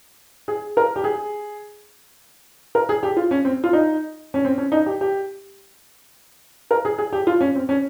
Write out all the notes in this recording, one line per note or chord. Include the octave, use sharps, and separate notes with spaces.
G#4
A#4
G4
G#4
A#4
G#4
G4
F4
C#4
C4
F4
D#4
C#4
C4
C#4
D#4
G4
G4
A#4
G#4
G#4
G4
F4
C#4
C4
C#4